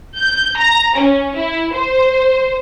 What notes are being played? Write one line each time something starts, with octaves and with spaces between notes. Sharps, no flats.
G6
A#5
C#4
E4
C5